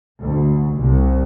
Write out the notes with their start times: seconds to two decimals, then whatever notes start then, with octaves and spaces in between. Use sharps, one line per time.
0.20 D2
0.75 C2